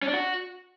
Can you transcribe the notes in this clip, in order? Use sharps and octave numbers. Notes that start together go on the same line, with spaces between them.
C#4
D4
F#4